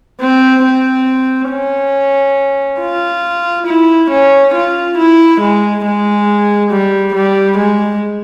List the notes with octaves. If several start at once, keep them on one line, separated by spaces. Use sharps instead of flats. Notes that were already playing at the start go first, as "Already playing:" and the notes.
C4
C4
C#4
F4
E4
C#4
F4
E4
G#3
G#3
G3
G3
G#3